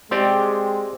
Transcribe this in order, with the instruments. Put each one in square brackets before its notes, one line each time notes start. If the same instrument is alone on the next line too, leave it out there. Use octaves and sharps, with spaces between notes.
[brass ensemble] G#3 [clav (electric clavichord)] C4 G4 D5